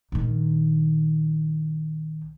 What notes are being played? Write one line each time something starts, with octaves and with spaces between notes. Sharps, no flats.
A#1 D#3